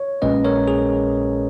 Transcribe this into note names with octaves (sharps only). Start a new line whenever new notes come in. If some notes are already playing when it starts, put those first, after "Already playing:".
Already playing: C#5
A#1 A#2 G#3 C#4 B4 D#5
A#4 C#5
G#4